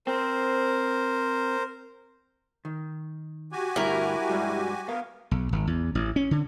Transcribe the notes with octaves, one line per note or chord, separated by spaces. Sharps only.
C4 A#4 C5
D#3
F#4 G4 G#5
D2 G2 G3 E4 A#4
G2 G3 G#3
B3 A#4 F5
B1
G#1
E2
A1
C#4
D3